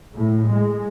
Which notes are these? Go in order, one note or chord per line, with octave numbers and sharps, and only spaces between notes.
A2
G#3